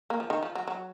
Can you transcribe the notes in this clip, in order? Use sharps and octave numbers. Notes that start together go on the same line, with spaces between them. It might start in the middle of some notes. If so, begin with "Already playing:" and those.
A#3
F3
D#3
F3
F#3
F#3